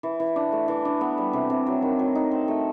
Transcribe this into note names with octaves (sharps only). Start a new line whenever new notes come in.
E3
E3
D4
A3
E3
D4
B3
G3
C3
C3
F#3
D#3
F#3
D#4
C4
A3